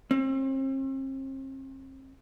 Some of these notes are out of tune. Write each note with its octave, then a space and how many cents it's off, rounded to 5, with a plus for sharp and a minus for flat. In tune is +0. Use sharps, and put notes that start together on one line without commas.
C4 +40